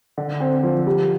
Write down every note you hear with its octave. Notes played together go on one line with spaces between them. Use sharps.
D3
C4
F3
G3